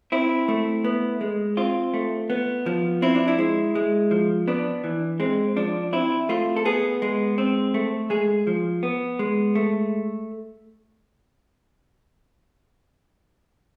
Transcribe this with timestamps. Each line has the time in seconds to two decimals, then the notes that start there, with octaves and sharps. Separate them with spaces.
0.12 C4 E4
0.48 A3
0.84 B3
1.21 G#3
1.57 C4 F4
1.94 A3
2.30 B3
2.66 F3
3.02 C4 E4
3.15 D4
3.28 E4
3.39 G#3
3.75 G#3
4.11 F3
4.48 B3 D4
4.84 E3
5.20 G#3 C4
5.56 F3 D4
5.93 C4 E4
6.29 A3 F4
6.56 A4
6.65 B3 G#4
7.02 G#3
7.38 C4
7.74 A3
8.10 G#3 G#4
8.47 F3
8.83 B3
9.19 G#3
9.55 A3